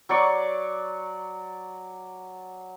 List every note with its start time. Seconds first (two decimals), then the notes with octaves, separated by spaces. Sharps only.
0.09 F#3 D5 C#6 D6